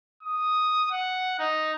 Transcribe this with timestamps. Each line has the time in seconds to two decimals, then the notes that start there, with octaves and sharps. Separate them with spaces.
0.23 D#6
0.91 F#5
1.39 D#4